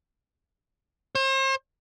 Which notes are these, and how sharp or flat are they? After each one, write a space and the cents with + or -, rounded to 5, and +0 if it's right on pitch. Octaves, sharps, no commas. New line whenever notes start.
C5 +40